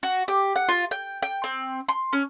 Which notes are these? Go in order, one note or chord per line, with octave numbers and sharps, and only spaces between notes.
F#4
G4
F#5
F4
G5
G5
C4
C6
C#4